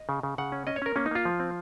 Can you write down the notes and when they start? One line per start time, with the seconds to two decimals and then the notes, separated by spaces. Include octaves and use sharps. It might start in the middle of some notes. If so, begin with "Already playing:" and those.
Already playing: D#5
0.09 C#3
0.23 C#3
0.38 C#3 F#5
0.52 C#4
0.67 C#4 D#5
0.76 C#5
0.82 C#4 A#4
0.96 A#3 C#4
1.06 D#4
1.11 A#3 F4
1.25 F3
1.40 C4